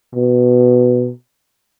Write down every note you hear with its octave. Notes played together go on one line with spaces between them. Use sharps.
B2